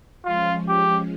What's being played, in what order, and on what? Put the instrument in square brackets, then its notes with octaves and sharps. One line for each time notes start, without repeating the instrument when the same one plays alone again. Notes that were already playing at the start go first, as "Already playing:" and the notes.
[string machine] F3 G#3 C#4 [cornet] F4
[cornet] G4